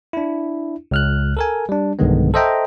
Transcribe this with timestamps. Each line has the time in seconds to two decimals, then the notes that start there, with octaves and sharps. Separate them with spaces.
0.13 D4 E4
0.91 C#2 F6 F#6
1.37 A4 A#4 G#5
1.69 G3 D4
1.99 B1 G2 D3 D#3 G#3 B3
2.34 A4 C5 D#5 E5 G5 A#5